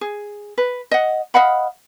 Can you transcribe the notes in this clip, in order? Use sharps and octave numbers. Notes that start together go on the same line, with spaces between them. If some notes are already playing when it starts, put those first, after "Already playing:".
G#4
B4
D#5 F#5
D#5 F5 F#5 B5